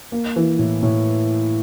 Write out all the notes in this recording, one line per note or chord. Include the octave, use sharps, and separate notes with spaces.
A#3
E3
A2
A2